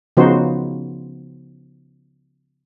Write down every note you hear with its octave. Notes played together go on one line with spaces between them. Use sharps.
C#3 F3 B3 D#4 F#4 C5